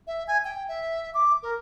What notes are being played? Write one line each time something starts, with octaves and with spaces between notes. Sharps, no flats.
E5
G#5
G5
E5
D6
A#4